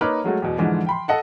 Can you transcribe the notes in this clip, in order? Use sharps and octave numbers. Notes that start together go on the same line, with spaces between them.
A#3 D#4 B4 C#5 D6 F6
F#3 G#3 A3 F#4
E2 B2
G#2 D3 E3 F3 G#3
G5 B5 C6
A4 D#5 F#5 A5